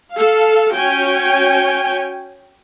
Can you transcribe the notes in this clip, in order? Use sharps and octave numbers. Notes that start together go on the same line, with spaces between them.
A4 F5
C#4 F#4 C#5 G5 G#5